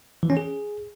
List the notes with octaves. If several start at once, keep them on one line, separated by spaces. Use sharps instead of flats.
E3
C#4
G#4